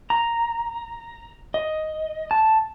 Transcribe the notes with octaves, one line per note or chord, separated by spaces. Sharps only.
A#5
D#5
A5